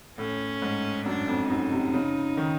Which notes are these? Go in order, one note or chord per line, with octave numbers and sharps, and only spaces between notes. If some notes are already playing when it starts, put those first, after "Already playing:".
A2 C#4
G#2
F#2 D4
F2
F#2 D#4
C3
C#3
D#3